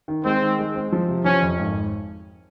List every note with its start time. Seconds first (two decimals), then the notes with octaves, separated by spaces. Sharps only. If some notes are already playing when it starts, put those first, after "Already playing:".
0.08 D#3
0.25 G#3 C4
0.42 D#3
0.59 G#3
0.75 C4
0.92 F3
1.09 C3
1.25 F3 C#4
1.42 F2
1.59 G#1